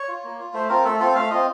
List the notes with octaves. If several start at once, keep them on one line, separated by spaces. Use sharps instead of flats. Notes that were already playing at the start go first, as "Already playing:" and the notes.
Already playing: C#5
F4
A#3
F4
A3 C5
C4 F4 A#4
A3 A4
C4 F4 A4
A3 F5
C4 F4 D#5